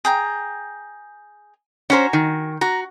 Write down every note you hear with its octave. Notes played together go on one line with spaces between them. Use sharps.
G#4 G5 A#5
C#4 F#4 C5 G#5 A#5
D#3
F#4 A#5